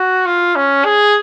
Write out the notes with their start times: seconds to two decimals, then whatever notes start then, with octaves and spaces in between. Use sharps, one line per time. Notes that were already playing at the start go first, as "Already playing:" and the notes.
Already playing: F#4
0.26 F4
0.55 C#4
0.85 G#4